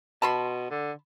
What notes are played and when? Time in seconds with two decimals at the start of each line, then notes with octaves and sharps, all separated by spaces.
0.22 B2 A5 B5 C6
0.71 D3